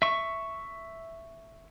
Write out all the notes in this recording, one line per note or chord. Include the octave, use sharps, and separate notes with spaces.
E5 C#6